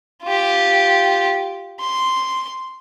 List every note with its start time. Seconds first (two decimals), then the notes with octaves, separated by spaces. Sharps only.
0.24 F4 G4
1.80 C6